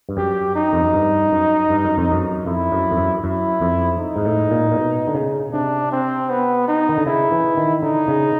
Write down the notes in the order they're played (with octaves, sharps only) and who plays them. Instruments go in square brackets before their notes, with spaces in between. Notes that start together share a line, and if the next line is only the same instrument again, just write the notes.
[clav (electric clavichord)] G2
[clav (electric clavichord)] F#2 [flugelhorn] G4
[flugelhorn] D#4
[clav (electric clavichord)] F2
F#2
G2
F#2
G2
F#2
F2
F#2
[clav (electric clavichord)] F2 [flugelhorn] E4
[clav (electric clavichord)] F#2
F2
F#2
[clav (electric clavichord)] F#2 [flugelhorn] E4
[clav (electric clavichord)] F2
[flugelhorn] D#4
[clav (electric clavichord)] G#2
A2
A#2
A#2
B2
D3
C#3
[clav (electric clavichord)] C3 [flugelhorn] D4
[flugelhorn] C4
B3
D#4
[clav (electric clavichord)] D#3
D3
[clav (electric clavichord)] C#3 [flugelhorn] E4
[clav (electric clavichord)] E3
D#3
[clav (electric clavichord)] D3 [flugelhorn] D#4
[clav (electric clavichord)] C#3